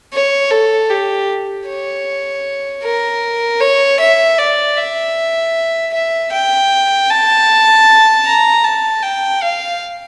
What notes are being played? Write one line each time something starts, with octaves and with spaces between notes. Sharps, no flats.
C#5
A4
G4
C#5
A#4
C#5
E5
D5
E5
E5
G5
A5
A#5
A5
G5
F5